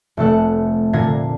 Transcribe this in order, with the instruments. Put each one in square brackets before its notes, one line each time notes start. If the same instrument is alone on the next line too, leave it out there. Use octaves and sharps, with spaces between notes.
[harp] F1 A3 A4 F#5
A#2 D3 A3 G#6 A#6 C7